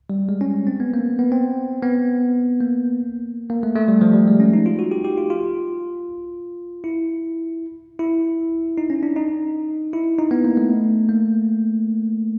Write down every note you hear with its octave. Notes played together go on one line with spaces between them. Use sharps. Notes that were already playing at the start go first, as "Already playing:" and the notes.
G3
G#3
C#4
C4
B3
A#3
B3
C4
B3
A#3
A#3
A3
A3
G3
F3
G3
G#3
C#4
D#4
F4
F#4
G4
G4
F4
F4
E4
E4
D#4
C#4
D4
D#4
E4
D#4
B3
A#3
A3
A#3